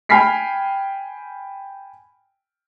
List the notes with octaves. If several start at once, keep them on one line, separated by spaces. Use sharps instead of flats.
G5 G#5 B5 F6 B6 C7